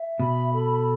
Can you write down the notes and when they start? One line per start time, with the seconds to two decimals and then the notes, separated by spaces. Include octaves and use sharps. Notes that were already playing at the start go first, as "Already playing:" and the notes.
Already playing: E5
0.19 B2 B5
0.52 A4